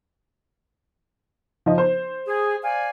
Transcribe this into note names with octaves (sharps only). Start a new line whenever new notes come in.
F3 D#5
C5
G#4
D5 F5 G#5